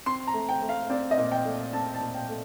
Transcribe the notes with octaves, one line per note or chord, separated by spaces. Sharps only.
C4 C6
A#5
A3
G5
A3
F5
C4 D5
D#5
A#2
G5
A3
C4 A5
A5
A#2
G5
A3